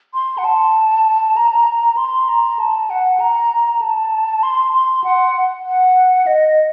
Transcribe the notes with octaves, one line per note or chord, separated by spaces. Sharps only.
C6
F#5
A5
A#5
C6
A#5
A5
F#5
A#5
A5
C6
C6
F#5
F#5
D#5